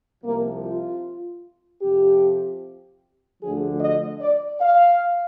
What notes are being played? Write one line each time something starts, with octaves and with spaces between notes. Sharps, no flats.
C2 C3 F3 A#3
F4
F2 C3 F3 G4
D2 D3 F3 G#4
D#5
D5
F5